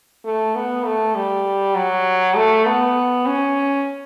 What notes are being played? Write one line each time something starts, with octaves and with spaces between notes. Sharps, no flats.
A3
B3
A3
G3
F#3
A3
B3
C#4